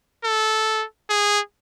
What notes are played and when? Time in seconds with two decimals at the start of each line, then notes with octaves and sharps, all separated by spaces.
0.24 A4
1.10 G#4